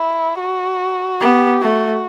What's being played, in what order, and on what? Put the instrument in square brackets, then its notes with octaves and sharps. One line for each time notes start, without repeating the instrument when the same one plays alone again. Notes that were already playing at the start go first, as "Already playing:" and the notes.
Already playing: [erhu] E4
F#4
[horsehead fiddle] B3 [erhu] G4
[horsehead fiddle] A3 [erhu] F#4